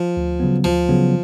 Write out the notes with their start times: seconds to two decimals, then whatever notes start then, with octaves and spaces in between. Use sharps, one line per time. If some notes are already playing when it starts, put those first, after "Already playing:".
Already playing: F3
0.17 D2
0.40 C#3 F#3 B3
0.64 D2 F3
0.89 C#3 F#3 B3